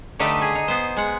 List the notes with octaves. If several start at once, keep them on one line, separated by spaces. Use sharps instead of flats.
D3 A3 D#4 G4 A4 B4
G#4
D#4
B3 C5
G#3 F#5